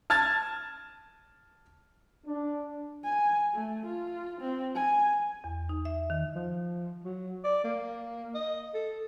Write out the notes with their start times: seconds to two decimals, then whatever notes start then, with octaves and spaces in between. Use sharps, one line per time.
0.10 A5 F6 G#6 A6
2.26 D4
3.04 G#5
3.54 A3
3.86 F4
4.41 C4
4.75 G#5
5.44 E2
5.69 D#4
5.85 E5
6.10 D#3
6.35 F3
7.04 F#3
7.44 D5
7.64 A#3
8.34 D#5
8.74 A4